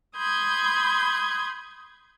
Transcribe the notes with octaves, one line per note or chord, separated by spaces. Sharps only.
B5 C6 D#6 G6 G#6